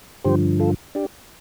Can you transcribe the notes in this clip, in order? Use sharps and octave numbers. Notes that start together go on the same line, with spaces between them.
G2 D3 F3 G4 C5
F4 A4
D4 G4